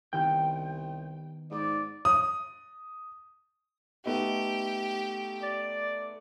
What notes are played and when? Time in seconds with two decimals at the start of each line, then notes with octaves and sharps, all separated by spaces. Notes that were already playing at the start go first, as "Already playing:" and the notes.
0.13 C2 D#3 B3 G5
1.51 G#2 D5 D7
2.05 D#6
4.06 A3 B3 D#4 G4
5.43 D5